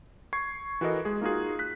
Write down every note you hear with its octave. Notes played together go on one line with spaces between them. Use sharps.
C#6 G#6 C7
E3 F#4 A4 A#4 D#5
G#3 G#4
A#3 D#4 F4 F#4 G#4
F#6 B6